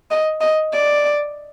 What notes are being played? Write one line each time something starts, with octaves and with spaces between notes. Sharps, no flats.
D#5
D#5
D5